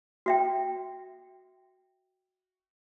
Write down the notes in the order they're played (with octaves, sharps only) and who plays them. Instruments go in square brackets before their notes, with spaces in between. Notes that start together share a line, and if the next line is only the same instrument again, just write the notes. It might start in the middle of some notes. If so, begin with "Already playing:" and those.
[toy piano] F#4 E5 G5